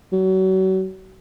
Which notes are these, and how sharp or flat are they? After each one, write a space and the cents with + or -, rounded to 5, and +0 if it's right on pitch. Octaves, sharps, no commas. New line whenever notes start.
F#3 +35